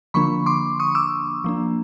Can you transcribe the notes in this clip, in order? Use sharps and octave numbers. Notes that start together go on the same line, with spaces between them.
D3 F3 A#3 D4 B5 C#6
C6 D6
C#6 D#6
D6 E6
F3 A#3 D4